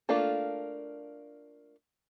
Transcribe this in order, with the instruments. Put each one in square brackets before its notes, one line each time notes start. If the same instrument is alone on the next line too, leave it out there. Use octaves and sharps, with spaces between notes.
[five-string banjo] A3 A#3 D4 F4 A4